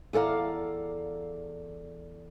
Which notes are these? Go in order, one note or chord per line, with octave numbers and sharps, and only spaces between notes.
E2 A4 D5 F5 A#5